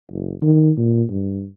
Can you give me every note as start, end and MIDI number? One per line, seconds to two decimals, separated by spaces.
0.12 0.34 30
0.42 0.71 51
0.78 1.04 46
1.10 1.46 43